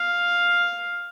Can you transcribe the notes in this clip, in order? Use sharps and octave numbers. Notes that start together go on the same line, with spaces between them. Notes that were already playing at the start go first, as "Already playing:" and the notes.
Already playing: F5